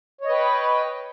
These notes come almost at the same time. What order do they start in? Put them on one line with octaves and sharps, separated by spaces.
C#5 D#5 B4 G5